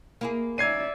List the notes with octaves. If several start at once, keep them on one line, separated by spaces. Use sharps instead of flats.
A#3 E4 G#4
C#4 D#4 D5 E5 G#6 C7 D#7